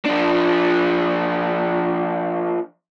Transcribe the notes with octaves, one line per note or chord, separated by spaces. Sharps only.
F3 D4